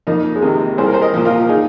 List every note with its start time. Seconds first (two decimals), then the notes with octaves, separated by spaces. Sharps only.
0.07 F2 A#3 D#4
0.35 G#3
0.42 C3 D#3 A#3
0.78 C2 G#4 C5
0.87 A#4
0.94 C5
1.02 A#4 D#5
1.14 A#2 F3
1.25 F4 A#4
1.49 D#4 G#4